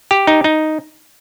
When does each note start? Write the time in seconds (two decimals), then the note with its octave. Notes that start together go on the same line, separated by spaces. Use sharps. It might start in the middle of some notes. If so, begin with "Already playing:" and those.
0.11 G4
0.27 D#4
0.44 D#4